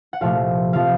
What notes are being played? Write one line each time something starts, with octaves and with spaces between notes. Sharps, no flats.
F#5
C2 A#2 F3 A3 C4 F5
C3 F3 C4 F5